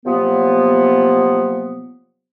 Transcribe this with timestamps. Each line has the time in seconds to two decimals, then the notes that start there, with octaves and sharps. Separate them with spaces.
0.05 C3 F3 F#3 A#3 B3